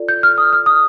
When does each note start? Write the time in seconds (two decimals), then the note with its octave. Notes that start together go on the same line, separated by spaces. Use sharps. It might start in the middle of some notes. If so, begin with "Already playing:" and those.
Already playing: F4 A4 D5
0.08 G6
0.23 F6
0.38 D#6
0.53 F6
0.66 D#6